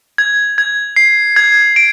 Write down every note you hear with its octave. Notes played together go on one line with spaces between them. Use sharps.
G#6
G#6
C7
G#6
D7